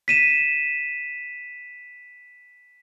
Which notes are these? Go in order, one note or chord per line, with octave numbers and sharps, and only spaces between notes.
B6 D#7 E7